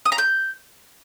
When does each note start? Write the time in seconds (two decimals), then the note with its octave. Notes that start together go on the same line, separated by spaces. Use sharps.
0.05 D#6
0.12 A#5
0.18 G6